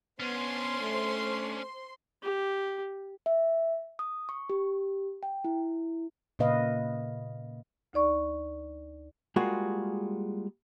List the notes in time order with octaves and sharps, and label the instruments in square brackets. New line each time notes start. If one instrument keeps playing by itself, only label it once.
[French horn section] B3 [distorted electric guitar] C#4 D4 [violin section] C5 C6
[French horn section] A3
[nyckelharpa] G4
[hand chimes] E5
D#6
C#6
G4
G5
E4
[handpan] A#2 C#3 A#3 B4 D#5 F5
[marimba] D2 D#4 D5 C#6
[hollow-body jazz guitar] G3 G#3 A#3 F4 F#4 G#4